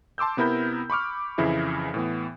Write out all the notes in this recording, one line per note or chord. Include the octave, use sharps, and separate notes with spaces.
A5 C6 D6 E6 G6
C3 B3 E4 A#4 B5 G6
B5 C#6 D6 F6
F2 C#3 E3 E4 G#4 E5
A2 E3 B3